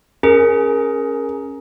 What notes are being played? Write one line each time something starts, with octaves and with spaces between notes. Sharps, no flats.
C#4 G#4 A#4